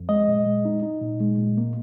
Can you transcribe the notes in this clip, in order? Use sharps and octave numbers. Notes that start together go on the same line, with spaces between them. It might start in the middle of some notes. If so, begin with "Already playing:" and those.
Already playing: F2
G#3 D#5
A#2
G#3
D#4
D#4
A#2
G#3
A#2
A#3